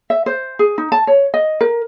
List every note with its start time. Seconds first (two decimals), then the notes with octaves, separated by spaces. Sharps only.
0.10 E5
0.26 C5
0.59 G#4
0.78 D#4
0.92 A5
1.07 C#5
1.34 D#5
1.61 A#4